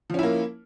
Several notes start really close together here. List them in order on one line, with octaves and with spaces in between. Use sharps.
F3 C#4 E4 A#3